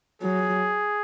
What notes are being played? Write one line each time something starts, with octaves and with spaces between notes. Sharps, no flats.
F#3 G#4